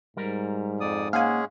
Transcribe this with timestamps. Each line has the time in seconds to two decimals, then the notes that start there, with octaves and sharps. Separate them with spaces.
0.17 G#2 G3 A#4
0.80 F2 D5 D#6
1.13 G#3 A#3 C#4 G#4 F5 F#5 G#5